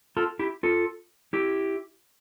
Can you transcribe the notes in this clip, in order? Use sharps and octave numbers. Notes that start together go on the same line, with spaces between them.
F4 A4
E4 G4
F4 A4
E4 G4